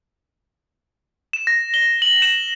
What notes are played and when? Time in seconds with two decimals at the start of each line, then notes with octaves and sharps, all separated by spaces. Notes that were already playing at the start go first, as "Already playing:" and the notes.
1.33 E7
1.47 A#6
1.74 G7
2.02 F#7
2.22 E7